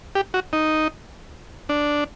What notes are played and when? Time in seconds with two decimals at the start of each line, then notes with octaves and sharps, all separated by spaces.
0.15 G4
0.34 F#4
0.53 D#4
1.69 D4